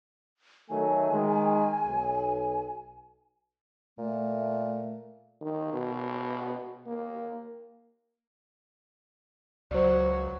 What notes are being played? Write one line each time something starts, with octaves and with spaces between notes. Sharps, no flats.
D#3 F#3 A3 G#5
D#3 G#3
B1
A#2 A3
D#3
B2
A#3
C#2 F#3 C5 D5